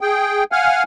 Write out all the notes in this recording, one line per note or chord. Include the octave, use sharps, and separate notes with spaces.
G#4 G5
F5 F#5 G#5 F6